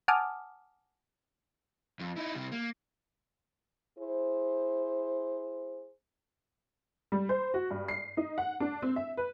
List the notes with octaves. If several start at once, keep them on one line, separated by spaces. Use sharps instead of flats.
F#5 G#5 A5 D6 D#6 F6
F2
D#4 E4
C3 G3
A#3
E4 G#4 C5
G3
C5
F#4
G2
C7
D#4
F#5
D4
C4
E5
B4